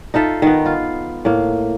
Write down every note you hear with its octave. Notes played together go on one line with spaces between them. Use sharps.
D#4 F4 A4 E5
D#3 B3
F4
A2 A#3